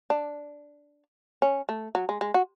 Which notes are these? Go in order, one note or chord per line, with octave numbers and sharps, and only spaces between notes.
D4
C#4
A3
F#3
G#3
G#3
F#4